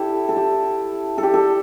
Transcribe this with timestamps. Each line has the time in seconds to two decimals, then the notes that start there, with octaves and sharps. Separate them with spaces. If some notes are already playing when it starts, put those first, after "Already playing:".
Already playing: E4 G4 A4
0.29 A4
0.36 G4
1.18 A4
1.23 G4
1.34 A4